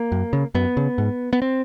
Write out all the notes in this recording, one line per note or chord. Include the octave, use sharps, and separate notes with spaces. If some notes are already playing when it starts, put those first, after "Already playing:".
Already playing: A#3
F#2
C#3
F#2 B3
C#3
G#2
B3
C4